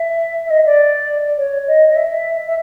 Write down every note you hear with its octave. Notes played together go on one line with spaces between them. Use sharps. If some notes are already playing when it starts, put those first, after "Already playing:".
Already playing: E5
E5
D#5
D5
C#5
D#5
D#5
E5
E5